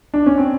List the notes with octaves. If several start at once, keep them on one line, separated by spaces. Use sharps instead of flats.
D4
C#4
C4